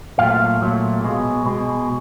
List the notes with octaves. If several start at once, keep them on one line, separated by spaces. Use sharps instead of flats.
A#2 F#3 A3 F5
A#2 F#3 A3
B2 G#3
B2 G#3